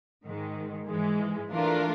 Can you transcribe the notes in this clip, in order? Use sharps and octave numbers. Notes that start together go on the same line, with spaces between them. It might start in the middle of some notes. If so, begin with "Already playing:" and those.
G#2 D#3 G#3
G#2 E3 G#3
E3 A3 D4 F4 A#4